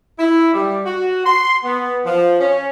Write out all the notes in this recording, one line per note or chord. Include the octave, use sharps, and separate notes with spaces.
E4
G3
F#4
C6
B3
F3
C#4